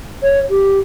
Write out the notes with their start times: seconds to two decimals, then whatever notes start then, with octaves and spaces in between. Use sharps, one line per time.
0.23 C#5
0.50 G4